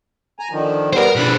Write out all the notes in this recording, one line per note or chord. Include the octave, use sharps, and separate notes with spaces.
G#5 A#5
D3 D#3 F3
G3 B3 A#4 C5
B2 F3 D4 B5 F#6